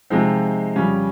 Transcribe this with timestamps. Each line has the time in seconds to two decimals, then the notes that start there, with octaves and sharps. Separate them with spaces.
0.10 C3 F3 G#3 C4 D#4
0.76 F2 C#3 G3 C#4